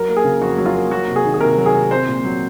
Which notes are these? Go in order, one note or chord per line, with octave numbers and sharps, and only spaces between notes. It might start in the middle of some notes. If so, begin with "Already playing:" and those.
Already playing: F#3 A#4
A#3
G#4
C#3
F2 F#4
F#3
F4
A#3
F#3 F#4
C3
G#4
D#3
G#4
C3 A#4
F#3
G#4
C3
C4 C5
A#2
F#3